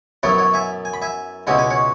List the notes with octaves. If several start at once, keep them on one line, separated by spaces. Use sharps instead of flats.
F#2 F#3 B3 E4 C#5 F#5
C#5 F#5
E5 G#5
G#5
B5
E5 G#5
C#2 B2 G#3 C#4 E4 F#5
G#5
C#5 F#5